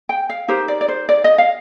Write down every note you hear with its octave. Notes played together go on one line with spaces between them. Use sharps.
G5
F5
D#4 G4 A#4 C5
D5
D5
C5
D5
D#5
F5